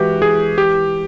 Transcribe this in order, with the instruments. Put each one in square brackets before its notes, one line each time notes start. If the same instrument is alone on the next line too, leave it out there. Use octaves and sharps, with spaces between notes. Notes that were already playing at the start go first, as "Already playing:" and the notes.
Already playing: [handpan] E3 G#3 [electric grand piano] F#4 G4
[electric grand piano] G#4
G4